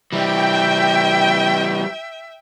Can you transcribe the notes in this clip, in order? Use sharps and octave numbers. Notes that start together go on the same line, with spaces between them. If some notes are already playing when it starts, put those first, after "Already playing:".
E3 G3 E5 G5